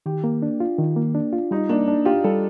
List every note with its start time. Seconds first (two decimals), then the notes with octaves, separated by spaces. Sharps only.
0.06 D#3 G4
0.24 A#3
0.42 D4
0.60 F4
0.78 D#3
0.96 A#3
1.15 D4
1.33 F4
1.51 G3 D#4
1.69 A#3 D4
1.88 D4
2.05 F4 G4
2.24 G3 A4